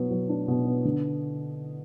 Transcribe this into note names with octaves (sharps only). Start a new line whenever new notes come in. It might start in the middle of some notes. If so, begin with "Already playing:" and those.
Already playing: B2 F#3 B3
F#3
D4
B2
B3
D3